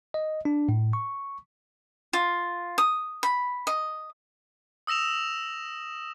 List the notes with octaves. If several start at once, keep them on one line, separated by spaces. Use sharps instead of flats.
D#5
D4
A2
C#6
F4
D#6
B5
D#5
D#6 E6 A#6 E7 F7